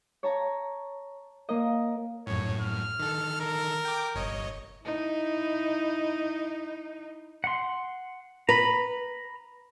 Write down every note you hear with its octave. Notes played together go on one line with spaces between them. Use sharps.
C#5 A5 A#5
A#3 A#4 D#5
F#2 A2 C#5
F6
D#3 A4
A#4
G5 D6
G1 C#5 D#5
D#4 E4
F#5 C6
B4 A#5 B5